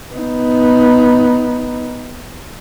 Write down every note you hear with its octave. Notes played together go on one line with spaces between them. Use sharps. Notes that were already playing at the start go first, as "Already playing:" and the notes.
B3 D#4